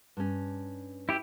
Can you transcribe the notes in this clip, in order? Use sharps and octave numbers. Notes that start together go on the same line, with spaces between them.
G2 C#4
E4 G4